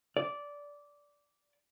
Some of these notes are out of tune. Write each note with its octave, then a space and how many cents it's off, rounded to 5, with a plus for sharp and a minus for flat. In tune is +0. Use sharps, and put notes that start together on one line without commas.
D5 -15